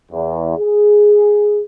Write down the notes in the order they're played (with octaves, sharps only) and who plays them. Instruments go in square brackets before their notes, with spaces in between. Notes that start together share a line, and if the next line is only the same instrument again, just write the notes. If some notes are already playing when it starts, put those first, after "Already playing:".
[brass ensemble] E2
G#4